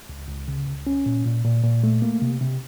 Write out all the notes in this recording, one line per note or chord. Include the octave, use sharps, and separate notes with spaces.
C#2
C#2
C#3
C#2
C#4
A#2
A#2
A#2
A#2
A3
A#3
C3
C3